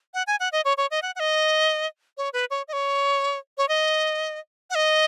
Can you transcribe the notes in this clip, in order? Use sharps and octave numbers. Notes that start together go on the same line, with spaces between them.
F#5
G#5
F#5
D#5
C#5
C#5
D#5
F#5
F#5
D#5
C#5
B4
C#5
D#5
C#5
C#5
D#5
F#5
D#5